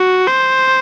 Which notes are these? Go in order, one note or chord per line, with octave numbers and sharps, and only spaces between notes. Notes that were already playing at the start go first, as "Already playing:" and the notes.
Already playing: F#4
C5